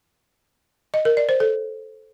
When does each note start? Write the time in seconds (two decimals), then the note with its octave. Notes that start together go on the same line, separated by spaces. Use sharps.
0.94 D#5
1.05 A#4
1.17 D5
1.29 C5
1.40 A4